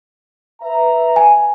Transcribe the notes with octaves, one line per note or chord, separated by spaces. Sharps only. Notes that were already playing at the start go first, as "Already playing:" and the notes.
B4 E5 A#5
G#5